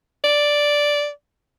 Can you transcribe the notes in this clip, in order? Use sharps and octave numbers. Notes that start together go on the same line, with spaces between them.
D5